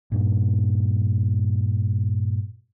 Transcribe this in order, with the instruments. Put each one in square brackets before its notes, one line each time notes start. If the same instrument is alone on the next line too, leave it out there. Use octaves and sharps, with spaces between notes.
[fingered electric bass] G2 A#2